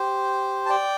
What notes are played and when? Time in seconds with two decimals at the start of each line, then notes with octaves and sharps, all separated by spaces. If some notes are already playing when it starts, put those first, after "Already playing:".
Already playing: G4 C5
0.66 A5
0.70 D5 G5